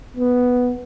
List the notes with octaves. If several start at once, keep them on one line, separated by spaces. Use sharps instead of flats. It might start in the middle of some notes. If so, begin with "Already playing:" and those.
B3